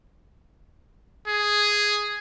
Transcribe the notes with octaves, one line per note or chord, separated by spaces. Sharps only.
G#4